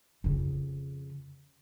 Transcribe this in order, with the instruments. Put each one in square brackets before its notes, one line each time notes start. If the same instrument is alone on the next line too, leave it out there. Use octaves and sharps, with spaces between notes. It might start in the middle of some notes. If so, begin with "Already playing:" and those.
[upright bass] F2 C#3